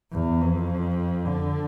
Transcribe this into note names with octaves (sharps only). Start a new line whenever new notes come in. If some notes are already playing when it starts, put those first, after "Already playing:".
E2
F2
D3